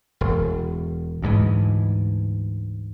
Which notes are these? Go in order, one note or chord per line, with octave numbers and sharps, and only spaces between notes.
E1
D2 G#2 E3